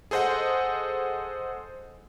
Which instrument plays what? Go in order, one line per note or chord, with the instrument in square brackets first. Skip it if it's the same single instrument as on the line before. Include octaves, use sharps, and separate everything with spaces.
[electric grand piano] G#4 A4 C5 D#5 F#5